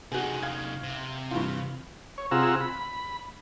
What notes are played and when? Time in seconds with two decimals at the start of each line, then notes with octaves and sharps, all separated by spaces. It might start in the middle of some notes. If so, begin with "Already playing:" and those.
0.12 C3 D#4 F#4 G#4
0.43 F5 G#6
0.83 C3
1.31 G2 E3 F4
2.18 C#5
2.31 C3 F4 G#4 F#5 A#5 E6
2.60 B5